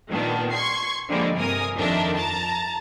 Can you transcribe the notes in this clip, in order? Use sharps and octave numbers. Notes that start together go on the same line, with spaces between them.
A#2 D#3 G3 B3 D4
C6 C#6 G#6 C7
D3 F3 G3 G#3 A#3
G2 C3 A#4 G#5 D#6
F2 D#3 D4 A#4 E5
A5 A#5 A6